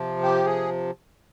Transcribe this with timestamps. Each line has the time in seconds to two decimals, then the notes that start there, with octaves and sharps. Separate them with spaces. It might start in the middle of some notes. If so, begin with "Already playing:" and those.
Already playing: C3 F3
0.22 G4
0.46 G#4